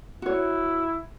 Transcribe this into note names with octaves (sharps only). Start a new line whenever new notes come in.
E4 F#4 C#5